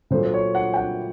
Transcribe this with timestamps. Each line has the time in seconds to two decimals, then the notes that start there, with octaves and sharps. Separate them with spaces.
0.11 A#2 F#3 A3 C5
0.26 C5
0.34 C#5
0.55 F#5
0.74 G5
0.77 F#5